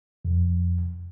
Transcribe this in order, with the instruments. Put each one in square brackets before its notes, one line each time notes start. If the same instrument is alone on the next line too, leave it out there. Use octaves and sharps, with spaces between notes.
[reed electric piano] F2